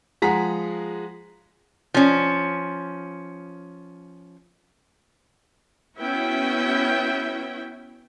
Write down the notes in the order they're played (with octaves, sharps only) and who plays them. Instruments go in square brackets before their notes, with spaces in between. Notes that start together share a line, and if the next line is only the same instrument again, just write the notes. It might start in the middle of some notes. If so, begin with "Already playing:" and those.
[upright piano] F3 G#3 G#4 F#5 A#5 B6
[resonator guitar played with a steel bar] F3 C#4
[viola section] B3 C#4 E4 F#4 E5 G5